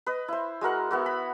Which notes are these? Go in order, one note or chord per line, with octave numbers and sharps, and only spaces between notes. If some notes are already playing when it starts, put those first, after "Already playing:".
B4 D#5
E4 C5
G#3 F#4 A#4 F#5
B3 E4 F#4
B5